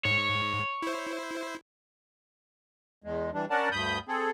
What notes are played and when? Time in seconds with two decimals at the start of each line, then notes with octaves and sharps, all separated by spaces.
0.05 G#2 C#5
0.82 E4 C5
3.04 E2 G#3
3.34 E3 G3 D4
3.50 C#4 D4 A#4 D5 F#5 A5
3.72 D2 G2 B5 D#6 G6
4.08 C4 G#4 A4